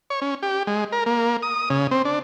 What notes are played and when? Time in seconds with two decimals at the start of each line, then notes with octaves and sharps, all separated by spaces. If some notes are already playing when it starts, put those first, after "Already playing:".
0.10 C#5
0.22 C#4
0.43 G4
0.67 G#3
0.92 A#4
1.06 A#3
1.43 D#6
1.70 C#3
1.91 C4
2.05 D4